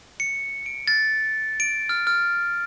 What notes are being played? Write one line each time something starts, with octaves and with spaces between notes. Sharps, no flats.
C#7
D7
A6
D7
F6
F6